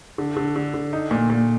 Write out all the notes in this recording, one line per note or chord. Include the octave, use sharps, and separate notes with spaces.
D3
D3
D3
D3
D#4
A#2
A#2